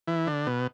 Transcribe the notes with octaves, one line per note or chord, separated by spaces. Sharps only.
E3
D3
B2